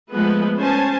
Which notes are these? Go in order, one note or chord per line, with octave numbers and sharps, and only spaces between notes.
F3 G#3 A3 B3 B4
C#4 C5 G#5 A5